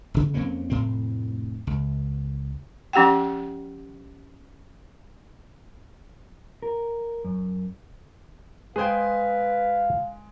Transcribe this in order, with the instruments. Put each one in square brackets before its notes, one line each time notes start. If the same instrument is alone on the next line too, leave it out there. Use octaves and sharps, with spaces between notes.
[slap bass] F1 C#3
F2 A#3 C4 C#4
F1 A2 C4
C#2
[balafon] F3 C#4 G4 F#5 G5
[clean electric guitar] A#4
F#2
[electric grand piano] G#3 G#5 [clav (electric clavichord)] G#4 C5 G5 [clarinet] B4 [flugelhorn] F5